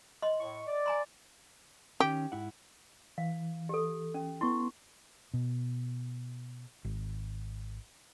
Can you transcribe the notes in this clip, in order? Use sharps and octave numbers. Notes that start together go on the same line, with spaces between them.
D#5 C6
A2 C#6
D5
G#5 A#5 C6
D#3 C#4 G4
G#2 E4 F#5
E3 F5
G4 A4
C#4
B3 E4 C6 C#6
B2
G#1